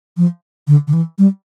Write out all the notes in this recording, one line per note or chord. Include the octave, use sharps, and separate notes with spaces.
F3
D3
D3
E3
G3